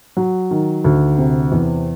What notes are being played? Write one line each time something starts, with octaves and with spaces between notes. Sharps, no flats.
F#3
D#3
D2
C3
E2